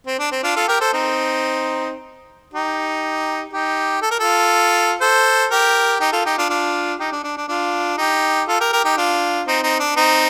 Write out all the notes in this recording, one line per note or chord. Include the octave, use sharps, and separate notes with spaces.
C4
D4
C4
D4 F4
F4 A4
G4 A#4
A4 C5
C4 D#4
D#4 G4
D#4 G4
A4
A#4
F4 A4
A4 C5
G4 A#4
D#4 G4
F4 A4
D#4 G4
D4 F4
D4 F4
D#4 G4
D4
D4
D4
D4 F4
D#4 G4
F4 A4
G4 A#4
G4 A#4
D#4 G4
D4 F4
C4 D#4
C4 D#4
D4
C4 D#4